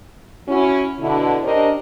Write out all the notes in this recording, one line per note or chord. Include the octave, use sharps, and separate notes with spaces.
C#4 E4 F#4
B2 D3 E4
C#4 D4 G4 A#4 C5 D#5